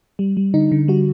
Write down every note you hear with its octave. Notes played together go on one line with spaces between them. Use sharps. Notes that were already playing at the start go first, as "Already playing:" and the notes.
G3
G3
D3 D#4
D3
G3 F#4